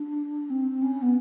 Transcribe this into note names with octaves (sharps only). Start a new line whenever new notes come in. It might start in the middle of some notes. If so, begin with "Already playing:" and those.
Already playing: D4
C4
C#4
B3